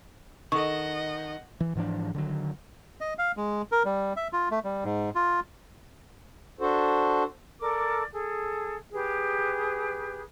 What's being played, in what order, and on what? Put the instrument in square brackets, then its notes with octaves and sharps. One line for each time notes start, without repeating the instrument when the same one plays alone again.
[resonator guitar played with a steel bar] D#3 [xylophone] A4 C#6 [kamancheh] D#5 F#5
[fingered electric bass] E3
G#2 E3 F3 D4
D3 D#3 F#3
[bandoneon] D#5
F5
G#3
A#4
G3
E5
F4
A3
G3
G#2
F4
[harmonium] D4 F#4 A4 C5
[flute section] A4 A#4 D5 D6
G#4 A4
G4 G#4 B4